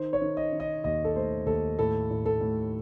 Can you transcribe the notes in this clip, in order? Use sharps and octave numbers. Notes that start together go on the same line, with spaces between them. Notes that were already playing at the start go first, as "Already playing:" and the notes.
Already playing: D#3 C5
C#5
D#3
D#5
D#3
D#5
D#2 D#5
A4
A3 C5
D#2 A4
A2 A4
A2
A4
A2